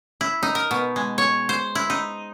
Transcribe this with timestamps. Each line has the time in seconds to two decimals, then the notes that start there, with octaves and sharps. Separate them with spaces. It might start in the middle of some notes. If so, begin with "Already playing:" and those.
0.21 E4
0.43 D#4
0.55 A#4
0.71 B2
0.96 G#3
1.18 C#5
1.49 C5
1.75 E4
1.90 D#4